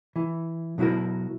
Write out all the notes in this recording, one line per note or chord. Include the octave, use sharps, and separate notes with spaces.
E3
B2 F#3 E4 F#4 A#4